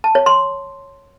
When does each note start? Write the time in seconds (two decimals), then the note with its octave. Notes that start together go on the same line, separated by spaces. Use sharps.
0.04 A5
0.15 C#5
0.26 C6